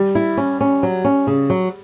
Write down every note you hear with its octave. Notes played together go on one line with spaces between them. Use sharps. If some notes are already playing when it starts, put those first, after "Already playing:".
Already playing: G3
E4
C#4
C#4
F#3
C#4
C#3
F#3